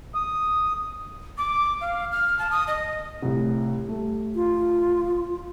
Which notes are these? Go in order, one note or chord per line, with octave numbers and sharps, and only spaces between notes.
D#6
D6
F5
F6
A5
D#6
D#5
C2 A2
G3 A3
F4